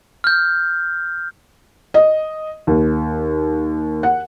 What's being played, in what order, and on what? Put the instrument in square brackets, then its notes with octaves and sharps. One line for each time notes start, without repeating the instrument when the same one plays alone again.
[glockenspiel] F6 G6
[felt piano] D#5
D#2
F#5